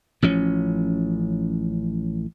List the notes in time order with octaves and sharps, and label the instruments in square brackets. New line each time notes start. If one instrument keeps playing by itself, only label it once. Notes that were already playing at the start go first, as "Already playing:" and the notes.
[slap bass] A1 F3 C#4